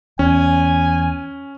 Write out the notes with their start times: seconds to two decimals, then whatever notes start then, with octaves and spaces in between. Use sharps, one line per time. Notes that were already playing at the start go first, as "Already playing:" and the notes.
0.19 E2 C#4 G#5